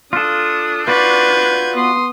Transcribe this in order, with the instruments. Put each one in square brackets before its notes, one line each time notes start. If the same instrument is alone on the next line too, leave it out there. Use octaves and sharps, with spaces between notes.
[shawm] D4 [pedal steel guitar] F4 A4 [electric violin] D#6
[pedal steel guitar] F4 F#4 D5 [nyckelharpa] B4 [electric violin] G6 G#6
[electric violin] B3 D#6 [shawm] C6